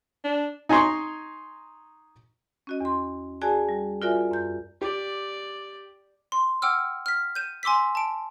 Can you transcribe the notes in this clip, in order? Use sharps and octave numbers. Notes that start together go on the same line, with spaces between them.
D4
D#4 G#5 A#5 C6 C#6
C#4 F#4 D#5
E2 C6
F#4 G#4 D5 G#5 A5
G3
F4 F#4 A#4 D5 E5 G#5
F#2 G6
G4 D5
C6
F#5 G5 D6 E6 F6
F6 B6
G6 D#7 E7
G#5 C6 D6 E6 B6
A5 D7